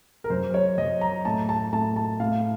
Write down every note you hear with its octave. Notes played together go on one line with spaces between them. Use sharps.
A#4
F#2 C5
C#5
F#2 D#5
A#5
A2 A5
A5
A2 A5
A5
A2 F5